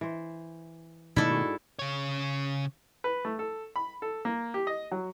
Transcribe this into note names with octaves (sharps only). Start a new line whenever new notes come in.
E3 C5
G#2 B2 D#3 A3 D4 E4 A4 F5
F#4 G#4
C#3 C#5
B4
A3
A4
B5
A4
A#3
G4
D#5
F#3